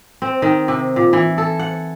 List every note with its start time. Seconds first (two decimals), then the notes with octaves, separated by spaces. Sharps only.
0.22 C4
0.42 D#3
0.68 C3
0.96 A#2
1.13 E3
1.38 A4
1.59 F#5